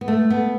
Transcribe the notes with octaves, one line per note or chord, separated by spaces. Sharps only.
B3
A3
B3